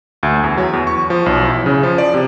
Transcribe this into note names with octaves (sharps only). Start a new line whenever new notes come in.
D2
E2
F#3
E2
C#6
F3
B1
E4
C#3
F3
D5
C3